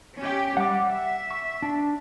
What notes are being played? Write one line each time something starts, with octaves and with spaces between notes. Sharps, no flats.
C#4 G4
G3 F#5 D6
E5
C#6
D4